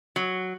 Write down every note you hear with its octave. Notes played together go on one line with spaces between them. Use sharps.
F#3